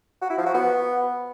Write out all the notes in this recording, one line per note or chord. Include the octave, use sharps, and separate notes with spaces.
F#4
E4
F3
F#4
B3